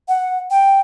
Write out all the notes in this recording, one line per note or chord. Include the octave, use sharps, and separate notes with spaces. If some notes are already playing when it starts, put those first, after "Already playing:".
F#5
G5